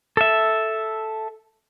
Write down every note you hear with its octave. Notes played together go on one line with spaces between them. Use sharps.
A4 E5